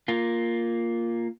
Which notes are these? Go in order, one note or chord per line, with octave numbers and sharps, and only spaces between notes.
A#3 F4